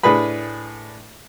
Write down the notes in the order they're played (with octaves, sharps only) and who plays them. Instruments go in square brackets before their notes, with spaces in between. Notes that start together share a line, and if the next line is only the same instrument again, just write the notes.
[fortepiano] A2 D4 G#4 B4 B5